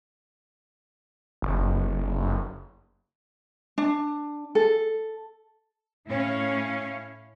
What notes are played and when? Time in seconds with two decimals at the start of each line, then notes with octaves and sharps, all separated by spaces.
1.42 F#1
3.78 D4
4.55 A4
6.07 A2 C#4 E4 C#5 F5